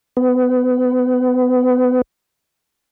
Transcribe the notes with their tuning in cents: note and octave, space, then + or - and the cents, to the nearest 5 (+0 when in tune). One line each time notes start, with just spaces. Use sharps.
B3 +30